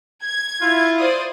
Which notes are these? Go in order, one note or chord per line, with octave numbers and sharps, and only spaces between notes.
G#6
E4 F4
C5 D5 D#6